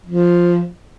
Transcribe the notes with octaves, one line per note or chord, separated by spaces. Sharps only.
F3